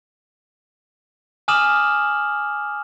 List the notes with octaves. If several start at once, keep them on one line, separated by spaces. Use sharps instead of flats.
G#5 D6 D#6 F6 E7 F#7